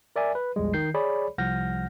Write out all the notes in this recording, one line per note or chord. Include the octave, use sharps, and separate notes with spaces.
A#4 D5 E5 G#5
B4
A#1 E2 F3 G3 G#3
D#3 G6 C7
G#4 C#5 D5 B5
C2 F3 F#5 F6 G6 A#6